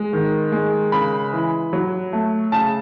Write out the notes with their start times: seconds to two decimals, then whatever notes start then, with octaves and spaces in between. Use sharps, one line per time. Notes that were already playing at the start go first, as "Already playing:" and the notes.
Already playing: G#3
0.13 D#3
0.52 G#3
0.92 C#3 B5
1.32 E3
1.73 F#3
2.13 A3
2.52 C#3 A5